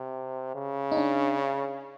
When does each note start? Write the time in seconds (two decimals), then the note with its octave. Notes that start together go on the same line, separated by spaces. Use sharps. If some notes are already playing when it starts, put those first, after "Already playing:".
Already playing: C3
0.55 C#3
0.92 D#4
0.97 D4